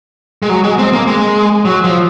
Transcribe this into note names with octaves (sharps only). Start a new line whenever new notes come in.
G#3
F#3
G#3
C4
A#3
G#3
F#3
F3